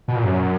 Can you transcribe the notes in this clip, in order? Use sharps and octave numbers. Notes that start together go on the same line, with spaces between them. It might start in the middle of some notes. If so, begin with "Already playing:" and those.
B2
A#2
F#2